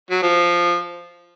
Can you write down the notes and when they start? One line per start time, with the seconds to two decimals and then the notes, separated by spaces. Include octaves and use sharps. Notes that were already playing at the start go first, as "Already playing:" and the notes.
0.11 F#3
0.22 F3